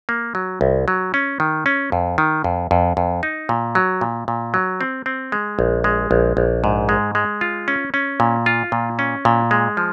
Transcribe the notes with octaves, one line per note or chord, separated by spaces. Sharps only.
A#3
F#3
C2
F#3
C#4
D#3
C#4
F2
D#3
F2
F2
F2
D#4
A#2
F#3
A#2
A#2
F#3
C4
C4
G#3
A#1
G#3
A#1
A#1
G#2
G#3
G#3
F4
C#4
C#4
A#2
F4
A#2
C#4
A#2
G#3
F3